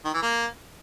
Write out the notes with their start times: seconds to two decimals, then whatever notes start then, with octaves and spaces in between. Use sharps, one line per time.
0.05 D#3
0.14 E3
0.22 A#3